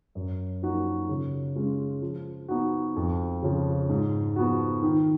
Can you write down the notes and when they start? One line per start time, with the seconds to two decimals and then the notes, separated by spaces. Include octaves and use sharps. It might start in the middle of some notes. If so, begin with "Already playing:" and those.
0.15 F#2
0.62 F3 A#3 D#4 F#4
1.09 C#3
1.56 G#3 C#4 F4
2.02 F3
2.48 B3 D#4 F#4
2.96 F2
3.43 C#3 F3
3.89 G#2
4.36 F3 B3 F#4
4.83 D#3